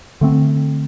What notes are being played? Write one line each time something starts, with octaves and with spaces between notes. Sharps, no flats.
D3 A3 C4